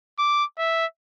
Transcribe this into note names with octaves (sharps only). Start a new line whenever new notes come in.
D6
E5